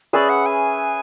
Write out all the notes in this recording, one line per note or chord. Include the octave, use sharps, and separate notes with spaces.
C#4 G#4 B4 D5 E5
F#5
G#5